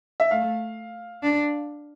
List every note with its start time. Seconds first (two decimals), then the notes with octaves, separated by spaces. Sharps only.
0.20 E5
0.31 A3 F5
1.23 D4